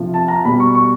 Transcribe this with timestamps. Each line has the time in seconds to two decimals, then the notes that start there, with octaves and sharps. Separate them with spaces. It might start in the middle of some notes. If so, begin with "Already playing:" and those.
Already playing: C3 F3
0.14 A5
0.28 A#5
0.44 B2 G3 B5
0.60 C#6
0.75 C#6